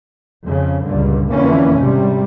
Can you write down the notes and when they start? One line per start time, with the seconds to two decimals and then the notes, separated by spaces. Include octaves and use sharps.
0.45 F2 C#3
0.86 C#2 G2 A#2 D3
1.31 F2 D3 E3 A#3 C#4
1.76 G#1 G#2 C3 G3